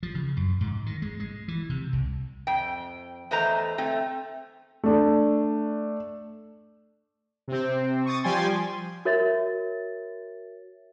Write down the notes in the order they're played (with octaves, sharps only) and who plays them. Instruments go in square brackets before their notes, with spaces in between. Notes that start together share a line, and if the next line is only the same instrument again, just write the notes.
[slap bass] F3
C#3
F#2
G#2
D#3
G#3
G#3
E3
C3
C2
[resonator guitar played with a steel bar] F2 G5
E2 A3 B4 C5 D#5 A#5
A3 C4
[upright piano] A3 D4
[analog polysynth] C3 C4
C#6 D#6 A6
F3 G3 G5 G#5 C6 A6
[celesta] F#4 A#4 C#5 E5 A6